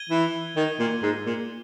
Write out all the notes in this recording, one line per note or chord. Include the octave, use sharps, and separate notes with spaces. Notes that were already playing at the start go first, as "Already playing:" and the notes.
Already playing: G#6 D#7 G7
E3
D#3
A#2
G#2
A#2